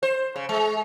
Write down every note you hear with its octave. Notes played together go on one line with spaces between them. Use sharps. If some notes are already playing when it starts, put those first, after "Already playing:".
C5
C#3
G#3